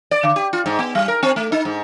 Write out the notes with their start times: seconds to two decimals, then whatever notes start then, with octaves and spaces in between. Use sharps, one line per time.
0.11 D5
0.23 D3
0.36 G4
0.53 F4
0.66 G#2
0.79 B3
0.95 G3
1.08 A#4
1.23 C4
1.36 A3
1.52 D#4
1.65 G#2